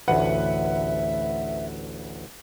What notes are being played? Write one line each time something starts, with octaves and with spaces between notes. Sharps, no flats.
A1 D2 B4 E5 F#5